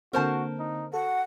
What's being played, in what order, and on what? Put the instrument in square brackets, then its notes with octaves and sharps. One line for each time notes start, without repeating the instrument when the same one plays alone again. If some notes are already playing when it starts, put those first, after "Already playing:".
[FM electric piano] D3 A#3 C4 [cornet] F#4 [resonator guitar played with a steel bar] A#4 C5 A5
[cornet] D#4
[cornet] F#4 [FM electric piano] A4 [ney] F#5